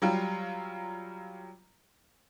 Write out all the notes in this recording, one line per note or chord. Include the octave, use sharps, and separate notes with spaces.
F#3 G3 F4